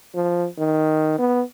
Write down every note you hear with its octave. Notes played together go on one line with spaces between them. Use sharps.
F3
D#3
B3